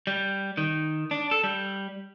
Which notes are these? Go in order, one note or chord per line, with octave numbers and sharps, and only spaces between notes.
G3
D#3
D4
A4
G3